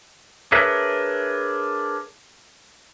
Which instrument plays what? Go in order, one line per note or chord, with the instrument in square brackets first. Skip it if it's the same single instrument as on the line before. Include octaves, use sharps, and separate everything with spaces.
[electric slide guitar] D4 G#4 A#4 B4 C#5 E5